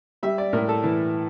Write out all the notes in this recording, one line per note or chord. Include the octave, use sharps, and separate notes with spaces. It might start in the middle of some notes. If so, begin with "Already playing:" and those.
G3 E5
D5
A2 A#4
A4
E3